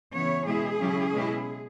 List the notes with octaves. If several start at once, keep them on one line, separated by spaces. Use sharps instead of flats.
C#3 E3 B3 E4 C#5
B2 G#3 E4 G#4
C#3 F#3 C#4 E4
B2 G#3 C#4 E4